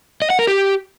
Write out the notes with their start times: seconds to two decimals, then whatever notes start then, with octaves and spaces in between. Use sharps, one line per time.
0.22 D#5
0.30 F#5
0.39 A#4
0.47 G4